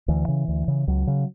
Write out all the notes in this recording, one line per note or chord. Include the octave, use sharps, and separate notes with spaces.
D2 E3
C#3
D2
C#3
C#2 F#3
C#3